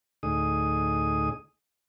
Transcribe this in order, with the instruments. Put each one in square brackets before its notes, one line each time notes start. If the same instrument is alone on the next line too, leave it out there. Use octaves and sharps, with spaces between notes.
[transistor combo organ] D2 A2 D#4 G#4 D#6